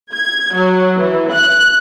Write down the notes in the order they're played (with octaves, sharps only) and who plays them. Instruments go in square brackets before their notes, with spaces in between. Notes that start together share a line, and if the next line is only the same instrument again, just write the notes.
[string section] G#6
F#3
E3
F#6